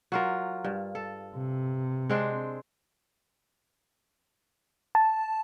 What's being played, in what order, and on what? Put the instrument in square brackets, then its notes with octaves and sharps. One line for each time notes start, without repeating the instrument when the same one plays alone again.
[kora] F#3 F4 A#4
G2
A4
[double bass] C3
[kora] G#3 C4 D4
[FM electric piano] A5